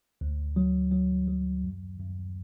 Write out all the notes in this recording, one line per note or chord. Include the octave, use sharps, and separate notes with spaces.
D2
F#3
F#3
F#3
F#2
F#2